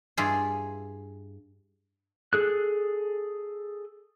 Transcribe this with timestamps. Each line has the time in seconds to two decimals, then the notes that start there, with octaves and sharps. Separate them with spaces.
0.17 G2 E4 F4 G#4
2.33 G#4 A4 F#6